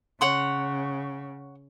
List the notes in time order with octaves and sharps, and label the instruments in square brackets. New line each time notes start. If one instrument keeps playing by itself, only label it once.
[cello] C#3 [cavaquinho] C#5 F#5 C6